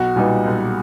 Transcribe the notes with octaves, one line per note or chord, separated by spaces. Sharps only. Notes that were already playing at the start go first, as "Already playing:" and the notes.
Already playing: B1 F#4
A#2 G3 B3 D#4
B1